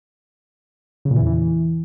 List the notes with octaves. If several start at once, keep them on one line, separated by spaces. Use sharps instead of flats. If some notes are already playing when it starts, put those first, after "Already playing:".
C#3
A#2
E3
E2
E3